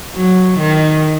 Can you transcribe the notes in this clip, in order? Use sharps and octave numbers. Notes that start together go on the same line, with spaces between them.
F#3
D#3